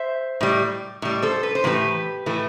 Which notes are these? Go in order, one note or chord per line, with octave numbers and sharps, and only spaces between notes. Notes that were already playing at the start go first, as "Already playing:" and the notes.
Already playing: C5 E5
A2 G3
A2 G3
A4 C5
B4
C5
A2 E3 A3 G4 B4
A2 E3 A3